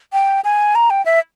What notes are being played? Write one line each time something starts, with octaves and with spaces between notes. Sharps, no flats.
G5
G#5
A#5
G5
E5